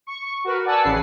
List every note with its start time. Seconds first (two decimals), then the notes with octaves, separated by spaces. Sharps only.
0.07 C#6
0.44 F#4 A#4 B4
0.65 D5 F#5 G#5 A5 E6
0.83 A1 C#3 B4 C7